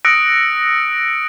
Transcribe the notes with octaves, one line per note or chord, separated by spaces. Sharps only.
D#6 E6 F#6 A#6 C#7 D7